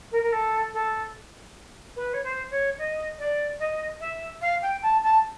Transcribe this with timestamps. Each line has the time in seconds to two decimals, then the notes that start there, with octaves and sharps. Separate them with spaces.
0.11 A#4
0.22 A#4
0.32 A4
0.73 A4
1.96 B4
2.13 C#5
2.23 C5
2.50 C#5
2.78 D#5
3.18 D5
3.59 D#5
4.00 E5
4.41 F5
4.62 G5
4.82 A5
5.03 A5